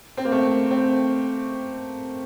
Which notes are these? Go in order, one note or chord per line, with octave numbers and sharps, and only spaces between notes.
C4
A#3
A3
C4